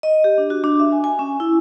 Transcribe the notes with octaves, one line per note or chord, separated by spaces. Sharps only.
D#5
G4
D4
F#4
D4
E5
G#5
G#5
C#4
E4